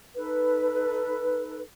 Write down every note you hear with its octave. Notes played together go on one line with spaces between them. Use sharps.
D#4 A4 B4